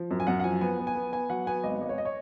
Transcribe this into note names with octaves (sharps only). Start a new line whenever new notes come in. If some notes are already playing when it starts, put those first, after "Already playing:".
Already playing: F3
F#2
G#5
F#2 F#5
F#5
F3 G#5
B3 G#5
B3
G#5
B3
B3 G#5
F#3 F#5
B3 G#5
G#1 D#5
G#1
C#5
D#5
C#5